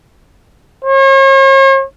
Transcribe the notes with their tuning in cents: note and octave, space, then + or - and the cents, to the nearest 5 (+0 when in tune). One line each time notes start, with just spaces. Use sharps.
C#5 -45